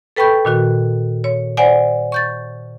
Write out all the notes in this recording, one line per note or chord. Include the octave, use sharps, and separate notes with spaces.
A4 B4 G5 B5 C#6 G6
A#2 D#3 F#4
C#5
C5 D5 F#5 G#5
C#6 G6 A6